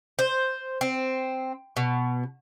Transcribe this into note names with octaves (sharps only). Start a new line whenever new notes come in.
C5
C4
B2